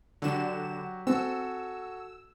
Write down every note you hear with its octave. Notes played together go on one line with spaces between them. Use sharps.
D3 F#3 F#4 G4 E7
C4 F#4 A4 G#5 E6